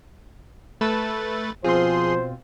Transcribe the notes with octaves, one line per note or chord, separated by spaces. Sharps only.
A3 A4 B4 E6 F#6 A6
B2 F3 C4 F4 G#4 C5 C6